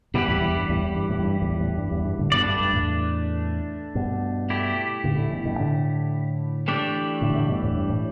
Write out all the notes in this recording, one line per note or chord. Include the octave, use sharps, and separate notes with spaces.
G2 B2 E3 G3 E4 G4 B4
E2 A2
E2
G2
E2 A2
E2
G2
E2 A2
G2
E2 A2
E2 A2
G2
E2
G2
A2 D3
G2 B2 A3 D4 B4 D5
G2
G2
E2 A2
G2 B2
A3 E4 G4
A2 D3
A2 D3
B2 E3
G2 B2
A2 D3
E3 A3 D4 G4 D5
A2 D3
A2 D3
G2 B2
E2 A2
G2
A2